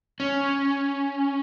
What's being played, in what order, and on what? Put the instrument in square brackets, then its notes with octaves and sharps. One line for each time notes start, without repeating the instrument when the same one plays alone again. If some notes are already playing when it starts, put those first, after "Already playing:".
[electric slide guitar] C#4